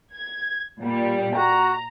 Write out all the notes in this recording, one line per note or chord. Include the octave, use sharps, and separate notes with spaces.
G#6
A#2 G3
F#4 A#5